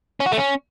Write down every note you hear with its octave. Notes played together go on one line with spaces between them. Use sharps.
C#4
F#4
A3
C#4